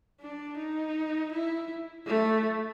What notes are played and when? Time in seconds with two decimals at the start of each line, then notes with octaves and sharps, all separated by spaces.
0.21 D4
0.57 D#4
1.32 E4
2.07 A3